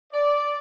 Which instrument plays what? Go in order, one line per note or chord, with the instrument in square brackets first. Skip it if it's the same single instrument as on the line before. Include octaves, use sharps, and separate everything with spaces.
[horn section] D5